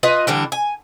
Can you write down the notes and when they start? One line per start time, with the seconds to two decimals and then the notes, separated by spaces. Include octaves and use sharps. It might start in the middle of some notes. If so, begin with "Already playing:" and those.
0.03 F4 B4 D#5 G#5
0.27 D3 E3 G3 D4
0.52 G#5